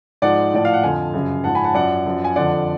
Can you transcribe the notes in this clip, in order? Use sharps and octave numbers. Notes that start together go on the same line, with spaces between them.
G#2 F3 D5 F#5
A2 F3 D5
F5
F#5
F2 D3 F3 F5 G#5
F#2 C#3 F3
G#2 F3 F#5 A5
G#5 B5
F#5 A5
F#2 F3 D5 F#5
F#2 F3
G#5
F2 D3 F3 D5 F#5